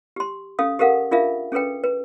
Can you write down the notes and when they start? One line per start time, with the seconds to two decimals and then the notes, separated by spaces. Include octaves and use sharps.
0.16 G4 C6
0.59 C#4 A4 F5 D#6
0.79 G4 A4 A#4 F5 F#5
1.11 D4 F4 G#4 A#4 E5 F5
1.52 C#4 G#4 A4 B4 G5
1.84 B4